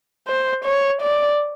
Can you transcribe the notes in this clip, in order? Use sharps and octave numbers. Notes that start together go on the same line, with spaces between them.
C5
C#5
D5